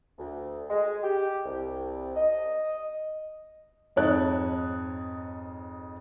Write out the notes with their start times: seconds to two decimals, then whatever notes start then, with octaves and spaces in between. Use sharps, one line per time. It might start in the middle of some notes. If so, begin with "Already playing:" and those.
0.19 D2
0.70 G#3
1.04 G4
1.45 C2
2.16 D#5
3.96 F2 G#2 C#5 D#5 A5 F#6